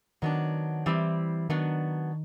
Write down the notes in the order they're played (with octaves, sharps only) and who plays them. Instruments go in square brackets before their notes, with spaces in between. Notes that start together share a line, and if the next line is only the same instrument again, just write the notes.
[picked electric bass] D#3 [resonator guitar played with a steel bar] F#3 B3 D4
[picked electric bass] E3 [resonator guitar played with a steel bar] G3 C4 E4
[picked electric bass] D#3 [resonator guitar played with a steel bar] F#3 B3 D4